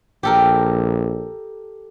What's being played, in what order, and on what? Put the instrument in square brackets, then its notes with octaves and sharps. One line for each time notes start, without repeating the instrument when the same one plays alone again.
[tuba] A#1 [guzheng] G4 A4 A#4